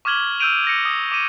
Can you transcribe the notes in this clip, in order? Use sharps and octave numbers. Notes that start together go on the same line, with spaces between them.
C#6 D6 F6 G#6 F#7 G7
E6 F6 G6 D7 D#7 F7
G#6 A#6 C#7
D#6
D6 D#7